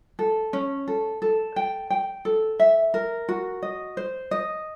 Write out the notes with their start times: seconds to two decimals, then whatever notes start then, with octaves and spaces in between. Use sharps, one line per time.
0.19 A4
0.53 C#4
0.88 A4
1.22 A4
1.56 G5
1.90 G5
2.25 A4
2.60 E5
2.94 A#4
3.29 F#4
3.63 D#5
3.97 C5
4.31 D#5